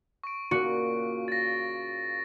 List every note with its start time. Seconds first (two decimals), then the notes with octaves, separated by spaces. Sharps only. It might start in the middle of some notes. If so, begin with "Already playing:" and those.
0.24 C#6 D7
0.51 A#2 C#3 F#4
1.28 A6 A#6